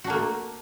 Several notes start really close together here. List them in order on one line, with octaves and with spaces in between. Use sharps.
F#4 D4 A#3 A3